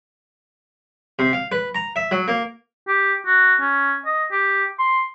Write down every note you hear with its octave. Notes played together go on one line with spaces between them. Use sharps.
C3
F5
B4
A#5
E5
F#3
A#3
G4
F#4
C#4
D#5
G4
C6